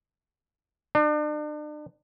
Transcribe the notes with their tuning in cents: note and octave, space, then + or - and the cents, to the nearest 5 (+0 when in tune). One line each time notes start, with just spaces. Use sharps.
D4 +40